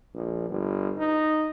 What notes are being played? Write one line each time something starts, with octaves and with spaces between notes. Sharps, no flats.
A#1
G1
D#4